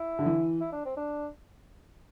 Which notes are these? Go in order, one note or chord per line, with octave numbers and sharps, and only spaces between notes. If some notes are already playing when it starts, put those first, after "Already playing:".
Already playing: E4
D3
E3
E4
D4
C4
D4